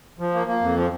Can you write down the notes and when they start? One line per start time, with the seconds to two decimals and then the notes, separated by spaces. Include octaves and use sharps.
0.19 F3
0.34 A#3
0.48 A#3
0.62 F2
0.76 F3